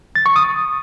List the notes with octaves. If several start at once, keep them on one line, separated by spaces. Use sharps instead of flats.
A6
C#6
D#6